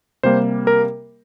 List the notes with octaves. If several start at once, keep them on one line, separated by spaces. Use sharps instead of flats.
C3 G3 A#3 C5
A#4